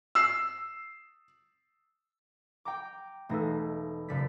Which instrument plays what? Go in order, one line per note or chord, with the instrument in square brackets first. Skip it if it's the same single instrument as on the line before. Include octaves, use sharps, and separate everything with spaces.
[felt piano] E6 C7
[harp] G5 A#5 D6
[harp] E1 A#6 [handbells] A3 D#4 A4
[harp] F#1 D5 B6